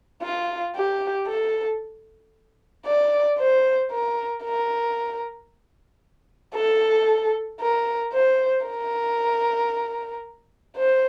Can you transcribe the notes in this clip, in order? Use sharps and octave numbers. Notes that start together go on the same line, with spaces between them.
F4
G4
A4
D5
C5
A#4
A#4
A4
A#4
C5
A#4
C5